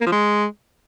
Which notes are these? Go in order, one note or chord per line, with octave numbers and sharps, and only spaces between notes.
A#3
F3
G#3